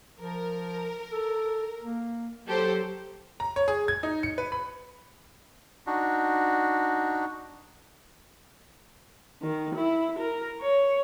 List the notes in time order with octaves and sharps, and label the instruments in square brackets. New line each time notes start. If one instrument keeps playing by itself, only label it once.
[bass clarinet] F3 [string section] A#4
[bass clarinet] A4
A#3
[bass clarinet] F#3 [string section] G4 A4 C5
[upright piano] A#5
C#5
G#4
G#6
D#4
C#7
B4
B5
[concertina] D4 D#4 F#4
[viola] D#3
E4
A#4
C#5